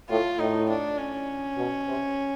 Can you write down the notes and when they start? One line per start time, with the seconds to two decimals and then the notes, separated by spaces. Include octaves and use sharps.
0.09 A2 F4
0.39 A2 D#4
0.69 D4
0.98 C#4
1.57 B2
1.88 C3